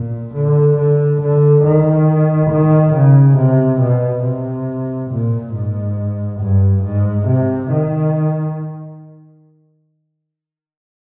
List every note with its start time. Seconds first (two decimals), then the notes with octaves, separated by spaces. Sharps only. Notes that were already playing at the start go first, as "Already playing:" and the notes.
Already playing: A#2
0.35 D3
0.78 D3
1.22 D3
1.64 D#3
2.51 D#3
2.94 C#3
3.38 C3
3.81 B2
4.24 C3
5.11 A#2
5.54 G#2
6.41 G2
6.84 G#2
7.27 C3
7.71 D#3